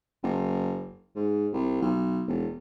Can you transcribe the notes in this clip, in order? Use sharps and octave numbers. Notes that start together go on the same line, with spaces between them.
F#1
G#2
C2
B1
E1